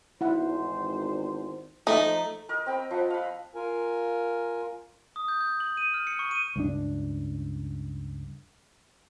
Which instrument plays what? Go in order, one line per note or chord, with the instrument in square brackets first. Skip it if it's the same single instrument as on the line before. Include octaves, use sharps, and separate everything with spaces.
[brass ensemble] G#1 E2 C5 [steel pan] E4 F#5
[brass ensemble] F3 [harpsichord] A3 [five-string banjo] D#4
[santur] A#4 D#5
C4 G5 B5
F3 F#5
F5 B5
[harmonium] F4 A#4 G#5
[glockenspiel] D#6
G6
G6
F#7
D#7
F6
C#7
C#6
D#7
[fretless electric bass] C#2 G2 D4